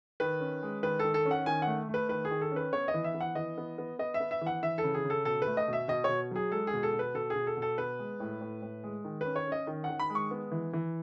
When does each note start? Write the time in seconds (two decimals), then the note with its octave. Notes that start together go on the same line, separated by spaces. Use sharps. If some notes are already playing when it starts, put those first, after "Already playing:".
0.20 D#3 B4
0.40 C#4
0.63 G#3
0.83 D#3 B4
0.99 D#3 A4
1.14 A4
1.25 C#4
1.31 F#5
1.46 D#3 G#5
1.62 F#5
1.67 A3
1.89 A3
1.94 B4
2.09 D#3 B4
2.25 G#4
2.31 D#3
2.41 A4
2.52 C#4 B4
2.73 B3 C#5
2.88 D#5
2.94 E3
3.04 E5
3.14 B3
3.21 F#5
3.35 E3 D#5
3.58 B3
3.78 B3
3.99 B3 D#5
4.14 E5
4.20 B3
4.31 E5
4.41 E3
4.47 F#5
4.63 E3 E5
4.78 A4
4.84 C#3
4.94 G#4
5.04 C#3
5.10 A4
5.25 B2 A4
5.42 B4
5.47 A3
5.57 D#5
5.68 B2 E5
5.88 B2 D#5
6.04 B2 C#5
6.31 F#3 G#4
6.51 G#3 A4
6.67 G#4
6.73 B2
6.83 A4
6.94 B2
6.99 B4
7.15 B2 A4
7.30 G#4
7.36 B2
7.47 A4
7.57 B2
7.62 A4
7.78 B3 B4
7.99 G#3
8.20 A2
8.41 A2
8.62 A2
8.84 G#3
9.04 D#3
9.21 C#4 B4
9.36 C#5
9.47 C#4 D#5
9.67 D#3
9.84 F#5
9.89 D#3
10.00 B5
10.10 G#3
10.15 C#6
10.31 B3
10.52 E3
10.73 E3